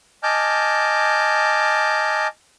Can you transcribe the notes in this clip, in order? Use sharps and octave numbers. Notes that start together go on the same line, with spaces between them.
D#5 G#5 A5 D6 F6 G6